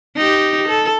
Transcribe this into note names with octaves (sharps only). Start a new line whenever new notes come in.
D#4 G4
A4